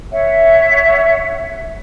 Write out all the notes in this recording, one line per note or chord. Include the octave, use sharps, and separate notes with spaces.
C#5 E5 F#5